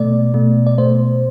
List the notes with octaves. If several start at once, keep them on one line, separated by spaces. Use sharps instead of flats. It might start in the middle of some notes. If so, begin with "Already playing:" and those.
Already playing: B2 A3 D5
B2 A3
D5
B2 A3 C5